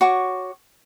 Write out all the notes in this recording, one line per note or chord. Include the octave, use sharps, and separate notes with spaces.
F#4 C#5 C#6 D6